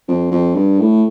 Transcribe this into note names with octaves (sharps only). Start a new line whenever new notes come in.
F2
F2
G2
A2